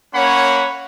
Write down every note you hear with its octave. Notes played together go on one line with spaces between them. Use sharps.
A#3 C#4 C#5 F#5 B5